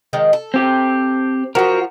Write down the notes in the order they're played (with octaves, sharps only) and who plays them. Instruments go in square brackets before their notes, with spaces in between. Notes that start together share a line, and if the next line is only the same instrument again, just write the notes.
[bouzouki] D#3 F3 G#3
A4
[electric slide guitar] C4 G4
[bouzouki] F3 F4 [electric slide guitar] F#4 A#4